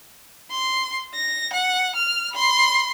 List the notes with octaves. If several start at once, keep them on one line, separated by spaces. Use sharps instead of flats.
C6
A#6
F#5
F6
B5 C6